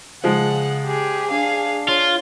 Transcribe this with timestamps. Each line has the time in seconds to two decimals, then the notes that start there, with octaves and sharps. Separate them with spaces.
0.24 C#3 F3 G#3 F#5
0.85 G4 G#4
1.31 D4 G#4 F5
1.89 F4 C#5